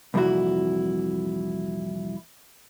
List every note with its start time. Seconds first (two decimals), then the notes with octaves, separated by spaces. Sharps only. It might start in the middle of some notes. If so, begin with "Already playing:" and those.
0.14 C2 F2 A#2 E3 E4 F#4